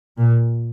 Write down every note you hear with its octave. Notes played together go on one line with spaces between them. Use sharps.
A#2